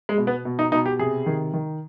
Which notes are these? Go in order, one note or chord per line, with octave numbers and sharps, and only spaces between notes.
G#3
B2
B3
B2
D#4
B2 D#4
G4
C3 G#4
D#3
D#3